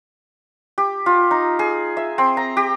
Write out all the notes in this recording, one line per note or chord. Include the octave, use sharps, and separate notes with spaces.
G4
F4
D#4
G#4
E5
C4
A#5
G4